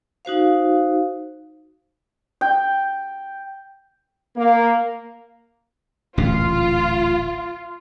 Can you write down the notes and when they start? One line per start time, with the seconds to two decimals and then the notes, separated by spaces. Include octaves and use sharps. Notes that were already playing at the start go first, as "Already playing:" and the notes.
0.25 D#4 F#4 C5 F5
2.41 G5
4.36 A#3
6.17 D1 A1 A#2 F4